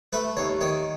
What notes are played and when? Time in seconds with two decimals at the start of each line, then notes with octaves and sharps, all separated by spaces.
0.13 A3 B4
0.37 D#2 C#5
0.61 D#3 C#5